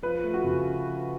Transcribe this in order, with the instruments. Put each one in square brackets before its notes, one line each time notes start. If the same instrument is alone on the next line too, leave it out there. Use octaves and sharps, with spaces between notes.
[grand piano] F3 [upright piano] B4
[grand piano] A3
[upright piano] F#4
[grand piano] C#3